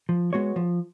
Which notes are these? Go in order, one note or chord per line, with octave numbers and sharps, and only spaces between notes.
F3
G#3 B3 F#4 C#5
F3